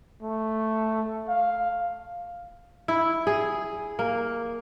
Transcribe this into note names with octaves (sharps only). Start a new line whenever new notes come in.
A3
F5
E4
G#4
A#3